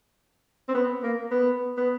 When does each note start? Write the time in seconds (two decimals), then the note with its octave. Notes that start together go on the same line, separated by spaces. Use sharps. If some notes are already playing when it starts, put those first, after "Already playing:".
0.68 C4
0.75 B3
1.03 A#3
1.31 B3
1.77 B3